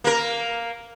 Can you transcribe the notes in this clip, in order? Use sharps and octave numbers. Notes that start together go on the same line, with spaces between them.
A#3 A#4